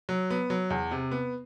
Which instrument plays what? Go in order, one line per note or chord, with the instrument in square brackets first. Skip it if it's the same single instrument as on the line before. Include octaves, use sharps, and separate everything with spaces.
[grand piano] F#3
B3
F#3
E2
C3
B3